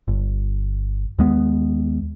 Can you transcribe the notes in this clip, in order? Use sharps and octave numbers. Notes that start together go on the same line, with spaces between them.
G1
D#2 G#3 B3